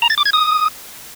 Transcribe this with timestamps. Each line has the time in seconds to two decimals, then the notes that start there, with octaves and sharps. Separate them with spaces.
0.02 A#5
0.10 A6
0.18 D6
0.25 G#6
0.33 D#6